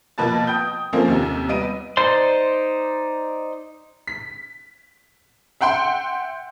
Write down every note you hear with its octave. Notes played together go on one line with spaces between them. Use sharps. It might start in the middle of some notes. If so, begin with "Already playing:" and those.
B2 F3 A#3 B4 A5 A6
G5 D#6 G6
F3 A3 A#3 C4 C#4
D#2 C3
G3 B3 D#5 D7 D#7
D#4 C5 D5 C6
B6
E5 F#5 G5 C6